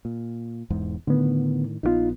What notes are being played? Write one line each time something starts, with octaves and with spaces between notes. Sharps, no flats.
A#2
E1 E2 G#2
A2 D3 D#3 B3
A#1 D3 B3 D#4 F4